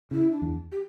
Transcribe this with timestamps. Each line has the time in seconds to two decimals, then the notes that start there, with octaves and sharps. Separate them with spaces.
0.11 C#3 E4
0.31 D4
0.42 E2
0.72 G4